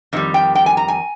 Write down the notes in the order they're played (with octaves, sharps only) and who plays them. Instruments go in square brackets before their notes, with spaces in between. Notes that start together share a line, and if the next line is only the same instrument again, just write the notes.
[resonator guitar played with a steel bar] F2 D#3 G3
G5
G5
G#5
A#5
G#5